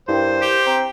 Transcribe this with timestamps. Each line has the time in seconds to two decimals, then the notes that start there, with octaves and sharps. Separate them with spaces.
0.09 G2 E4 A#4 C5 G5
0.42 G4
0.67 C4 A#5